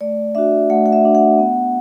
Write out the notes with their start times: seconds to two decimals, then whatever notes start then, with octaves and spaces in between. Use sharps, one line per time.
0.01 A3 D5
0.35 D4 F#4 E5
0.70 A3 F#5
0.86 F#5
0.93 E5
1.04 D4 F#4
1.15 F#5
1.38 B3